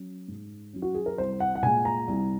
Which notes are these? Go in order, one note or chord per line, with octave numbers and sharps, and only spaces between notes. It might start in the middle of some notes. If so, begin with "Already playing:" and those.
Already playing: F#3 C#4
G#2
F#3 C#4
F#4
G#4
A#4
C2 C5
F#5
F#5
A#2 G#3 G#5
A#5
C2